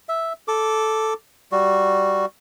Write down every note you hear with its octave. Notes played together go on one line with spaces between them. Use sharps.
E5
A4 D6
G3 F#4